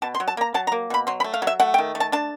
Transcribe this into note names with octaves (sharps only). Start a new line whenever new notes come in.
B2 A5
C6
F#3
A5
A#3 A#5
F#3 A5
A#5
A#3
B2 B5
F#3 C6
B5
A3
F5
F#3
E5
A3 F#5
G5
D#3
A3
A5
D4 A5